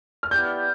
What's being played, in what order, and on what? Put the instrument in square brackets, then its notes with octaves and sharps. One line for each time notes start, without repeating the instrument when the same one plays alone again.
[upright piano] F6
[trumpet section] B3 E4 G4 D5 [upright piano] G6